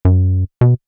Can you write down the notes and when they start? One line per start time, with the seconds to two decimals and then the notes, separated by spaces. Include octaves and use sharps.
0.05 F#2
0.61 B2